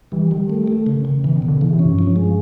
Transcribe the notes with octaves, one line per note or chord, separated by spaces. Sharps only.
E3 G3
D#3 G3
A3
A3
C#3
C#3
B2 E3
D#3
B2
D3
C#3 E3
C3
C#4
G2
F3
G#3